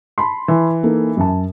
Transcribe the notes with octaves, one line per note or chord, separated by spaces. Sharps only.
A5 B5 C6
E3
A#3 D#4 A4
F#2 A5